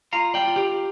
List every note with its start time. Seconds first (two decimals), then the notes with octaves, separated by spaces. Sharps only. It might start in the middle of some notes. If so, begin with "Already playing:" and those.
0.13 F4 F5 A#5
0.34 D5 G5
0.45 F4
0.56 G4